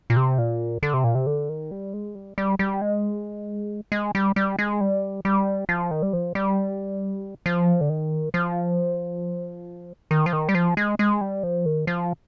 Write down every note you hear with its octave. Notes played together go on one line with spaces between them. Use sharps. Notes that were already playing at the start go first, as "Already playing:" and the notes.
A#2
C3
A#2
D3
C3
A#2
C3
D3
D#3
G3
G#3
G3
G3
G3
G#3
G#3
G3
G3
G#3
G3
G3
F3
D#3
G3
F3
G3
F3
D3
D#3
F3
D#3
F3
D#3
G3
F3
G#3
G#3
G3
F3
D#3
F3